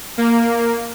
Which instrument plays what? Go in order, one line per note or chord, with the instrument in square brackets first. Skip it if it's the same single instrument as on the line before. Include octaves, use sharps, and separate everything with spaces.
[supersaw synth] A#3